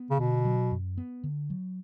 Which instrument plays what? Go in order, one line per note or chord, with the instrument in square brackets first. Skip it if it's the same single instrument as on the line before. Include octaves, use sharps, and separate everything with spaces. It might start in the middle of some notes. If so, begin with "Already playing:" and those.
Already playing: [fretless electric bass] B3
[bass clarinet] C#3
[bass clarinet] B2 [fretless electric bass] D3
[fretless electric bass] F#3
F#2
B3
D3
F#3